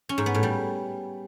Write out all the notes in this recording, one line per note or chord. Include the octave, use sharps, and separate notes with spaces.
C#4
G#2
B3
A2
G3